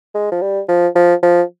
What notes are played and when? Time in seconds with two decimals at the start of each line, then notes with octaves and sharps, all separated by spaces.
0.15 G#3
0.31 F3
0.41 G3
0.69 F3
0.95 F3
1.23 F3